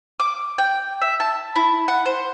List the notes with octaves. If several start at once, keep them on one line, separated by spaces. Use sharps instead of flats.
D6
G5
E5
A5
E4
F#5
C5